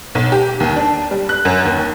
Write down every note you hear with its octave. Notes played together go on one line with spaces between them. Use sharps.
B1
G4
D#2
D4
G3
F#6
F#2
D#2